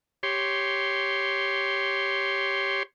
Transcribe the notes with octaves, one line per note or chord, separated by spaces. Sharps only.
G4 C#5 C6